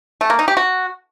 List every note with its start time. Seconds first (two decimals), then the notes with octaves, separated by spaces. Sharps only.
0.21 A3
0.30 A#3
0.39 D#4
0.48 G4
0.57 F#4